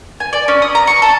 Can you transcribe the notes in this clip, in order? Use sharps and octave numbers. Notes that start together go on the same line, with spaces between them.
G#5
D5
C#4
D#6
A#5
C#6
A4